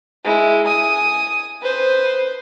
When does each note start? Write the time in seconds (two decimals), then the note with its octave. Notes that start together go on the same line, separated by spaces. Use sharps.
0.24 G#3 E4
0.66 G#5 D#6
1.62 B4 C5